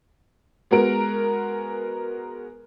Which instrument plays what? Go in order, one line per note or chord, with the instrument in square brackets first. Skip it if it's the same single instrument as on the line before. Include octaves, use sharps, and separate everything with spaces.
[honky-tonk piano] G#3 B3 F#4 A#4 D7